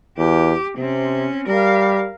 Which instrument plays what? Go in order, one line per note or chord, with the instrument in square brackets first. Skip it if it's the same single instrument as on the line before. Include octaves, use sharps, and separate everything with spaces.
[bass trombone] E2 [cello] G4
[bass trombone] C3 [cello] C4 C#4
[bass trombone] G3 [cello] A#4 F5